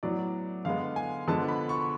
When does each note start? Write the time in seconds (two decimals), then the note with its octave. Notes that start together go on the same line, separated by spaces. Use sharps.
0.03 A2 F#3 B3 D5
0.65 D3 G#3 B3 F5
0.96 G#5
1.28 D3 F3 G#3 B3 A5
1.48 B5
1.69 C#6